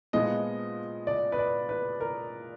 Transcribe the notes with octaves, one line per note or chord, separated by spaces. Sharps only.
A#2 F3 G#3 B3 D#5
D5
B4
D5
B4
A#4